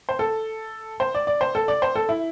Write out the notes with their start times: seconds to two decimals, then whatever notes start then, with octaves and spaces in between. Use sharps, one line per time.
0.09 C5
0.19 A4
1.00 C5
1.15 D5
1.27 D5
1.41 C5
1.55 A4
1.68 D5
1.82 C5
1.96 A4
2.09 E4